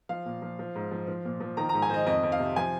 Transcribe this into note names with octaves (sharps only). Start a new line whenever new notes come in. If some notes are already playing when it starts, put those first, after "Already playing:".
F3 F5
A#2
F3
F3
G#2
F3
F3
A#2
F3
D#3 A#5
G#2 A#5
G#5
D#3 C5 D#5
F2 D#5
F2
F5
C3
F3 G#5